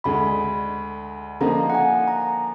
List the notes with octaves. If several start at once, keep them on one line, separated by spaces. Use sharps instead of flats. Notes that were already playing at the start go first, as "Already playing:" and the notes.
D2 D3 G#3 B5
D3 F3 A#3 D#4 A#5
F#5
G#5
A#5